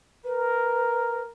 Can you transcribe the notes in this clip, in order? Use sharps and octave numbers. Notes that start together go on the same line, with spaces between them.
A#4 B4